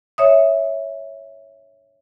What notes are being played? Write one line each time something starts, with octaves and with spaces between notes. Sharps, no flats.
C#5 E5 D#6